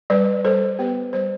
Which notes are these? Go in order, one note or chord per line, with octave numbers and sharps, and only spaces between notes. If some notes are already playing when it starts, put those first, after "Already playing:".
G3 B4 D5
G3 A4 C5
B3 G4 B4
G3 C5